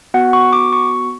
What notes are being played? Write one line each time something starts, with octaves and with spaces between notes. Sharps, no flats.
B3 F#4 F#5
C#6
D6
C#6